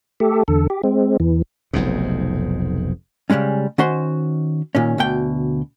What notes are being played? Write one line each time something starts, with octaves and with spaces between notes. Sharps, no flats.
A3 G4 A4
E2 D3 A4
G4
G#3 C4
E2 E3
F1 B1 F2 G#2
C#3 E3 G3 G#3 C#4
D#3 C#4 F#4 C5 C6
A#2 D#3 C#4
D2 B2 G5